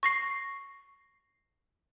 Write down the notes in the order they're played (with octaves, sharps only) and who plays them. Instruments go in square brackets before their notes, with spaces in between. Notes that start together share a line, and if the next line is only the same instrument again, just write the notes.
[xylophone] C#6 A#6 C7